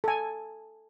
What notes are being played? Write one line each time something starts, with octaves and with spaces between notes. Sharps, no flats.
A4 G#5